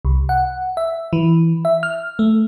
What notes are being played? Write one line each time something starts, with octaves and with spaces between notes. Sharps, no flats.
C2
F#5
E5
E3
E5
F6
A3